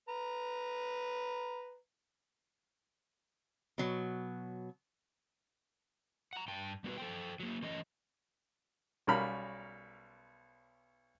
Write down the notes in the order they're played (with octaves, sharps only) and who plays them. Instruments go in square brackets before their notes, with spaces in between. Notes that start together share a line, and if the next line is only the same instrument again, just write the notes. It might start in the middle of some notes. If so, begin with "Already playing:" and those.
[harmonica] B4 A#5
[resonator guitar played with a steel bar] B2 F#3
[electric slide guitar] F#5 A#5
G2 G5 A5
G3 B3 F#4 B4
A4 C5 G5
F#3 A#3
E3 A3 C#4 C#5 D#5
[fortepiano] B1 G3 C#4 A#4 F5 B5